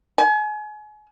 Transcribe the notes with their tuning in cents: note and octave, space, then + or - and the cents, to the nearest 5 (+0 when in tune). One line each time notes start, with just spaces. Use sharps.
G#5 +35